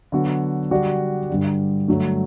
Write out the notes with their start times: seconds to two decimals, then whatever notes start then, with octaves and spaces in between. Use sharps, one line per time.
0.12 D3 F#3 B3 F#4
0.71 D3 G3 D4 F#4
1.30 G2 D3 G3
1.88 G2 D3 F#3 A3